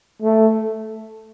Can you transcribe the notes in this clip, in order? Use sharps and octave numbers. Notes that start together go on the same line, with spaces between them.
A3